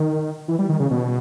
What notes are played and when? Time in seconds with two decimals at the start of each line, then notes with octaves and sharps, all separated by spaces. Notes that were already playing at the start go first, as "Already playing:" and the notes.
Already playing: D#3
0.48 E3
0.59 G3
0.69 D#3
0.80 C#3
0.91 B2